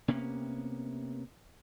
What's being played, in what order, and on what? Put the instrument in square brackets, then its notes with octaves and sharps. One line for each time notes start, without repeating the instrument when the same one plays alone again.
[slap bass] C3 A#3 B3 C#4